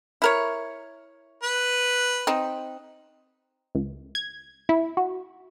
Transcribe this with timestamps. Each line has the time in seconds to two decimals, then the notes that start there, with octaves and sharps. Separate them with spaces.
0.22 E4 A#4 C#5
1.43 B4
2.27 C4 D#4
3.75 C#2
4.15 G#6
4.69 E4
4.97 F#4